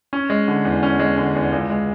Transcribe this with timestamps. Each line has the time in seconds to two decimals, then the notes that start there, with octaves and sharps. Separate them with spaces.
0.13 C#4
0.30 G#3
0.48 D3
0.65 E2
0.83 C#4
0.99 G#3
1.18 D3
1.35 E2
1.52 C#2
1.70 G#3